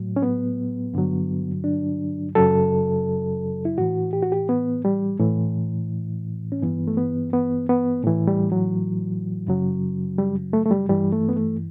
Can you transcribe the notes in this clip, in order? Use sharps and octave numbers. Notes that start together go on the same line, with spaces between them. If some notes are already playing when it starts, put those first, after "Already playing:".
Already playing: A2 F#3
C#4
B3
G2 D3 F#3
D4
F#2 C#3 F#3 A4
E4
A2 E3 F#4
G4
F#4
G4
B3
G3
A2 E3
C#4
G2 E3 B3
A3
B3
B3
B3
A2 E3
G3
F#3
F#2 C#3 F#3
G3
A3
A3
G3
G2 E3 G3
A3
B3
A3